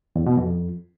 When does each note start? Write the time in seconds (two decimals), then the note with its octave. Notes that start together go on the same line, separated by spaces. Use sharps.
0.16 E2
0.26 B2
0.37 F2